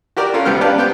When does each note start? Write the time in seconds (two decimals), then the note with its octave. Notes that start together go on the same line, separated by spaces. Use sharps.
0.17 F#4 G4 A#4 D5
0.34 C#4 F4 A4 A#4
0.45 G#1 C#2 B3 G4 C5 F6
0.61 C#4 D4 G4 B4 F5 A5
0.78 B3 G4 C5 G5